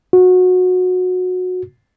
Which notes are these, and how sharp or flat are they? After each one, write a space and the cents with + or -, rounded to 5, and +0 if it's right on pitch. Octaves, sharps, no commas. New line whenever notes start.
F#4 -20